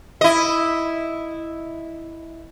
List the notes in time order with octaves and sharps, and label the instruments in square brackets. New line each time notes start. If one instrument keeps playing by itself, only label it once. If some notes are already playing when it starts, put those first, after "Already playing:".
[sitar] E4 D#5